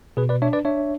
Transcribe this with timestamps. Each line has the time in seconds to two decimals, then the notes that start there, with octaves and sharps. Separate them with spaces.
0.17 B2 G#4 B4
0.29 B4 D5
0.42 D4 C#5 E5
0.53 B4 D5
0.65 D4 C#5 E5